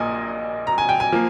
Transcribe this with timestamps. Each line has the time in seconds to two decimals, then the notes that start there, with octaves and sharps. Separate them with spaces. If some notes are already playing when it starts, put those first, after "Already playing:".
Already playing: A#1 A#2 A#3 D#5 G#5
0.67 A#5
0.78 G#5
0.89 G5
1.00 G#5
1.12 F3 A#3